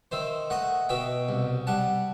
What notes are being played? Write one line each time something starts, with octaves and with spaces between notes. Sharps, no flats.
D#3 C5 E5
A3 D#5 F#5
B2 E5 G5
C2
G3 F#5 A5